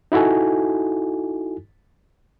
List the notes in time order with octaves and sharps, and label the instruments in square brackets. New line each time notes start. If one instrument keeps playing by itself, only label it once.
[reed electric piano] D#4 E4 F#4 A4 G#5